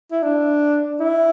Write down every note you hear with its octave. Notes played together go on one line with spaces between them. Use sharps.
E4
D4
E4